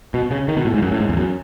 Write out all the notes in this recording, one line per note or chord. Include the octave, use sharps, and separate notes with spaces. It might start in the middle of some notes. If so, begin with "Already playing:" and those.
B2
C#3
D#3
B2
A2
G#2
F#2
A2
G#2
E2
F#2